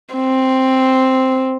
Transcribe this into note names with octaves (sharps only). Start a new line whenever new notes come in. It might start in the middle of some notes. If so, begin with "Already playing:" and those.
C4